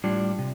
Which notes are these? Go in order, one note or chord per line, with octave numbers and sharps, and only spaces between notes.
A2 G3 D4 F4
C3